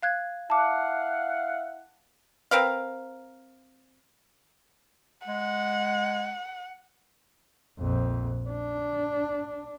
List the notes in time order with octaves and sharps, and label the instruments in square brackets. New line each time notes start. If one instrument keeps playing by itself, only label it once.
[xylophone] F5 F#6 G#6
[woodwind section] E4 F5 F#5 [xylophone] A5 D6
[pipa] C4 A#4 B4 F5
[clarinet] G#3 [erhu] F#5
[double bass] A#1 F2
D4